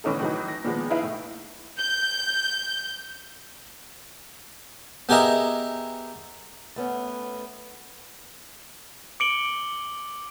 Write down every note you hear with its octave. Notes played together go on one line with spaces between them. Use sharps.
A2 D3 E3 C#4 D#4 A4
A2 E3 F#3 D#4
A#6
A#2 D#3 F3 G#3 B3
D#4 E4 B4 E5 F5
A2
G6
B3 G4 G#4 A#4 D#5 E5
A3 B3 C#4
D6 C#7 D7 F#7 G7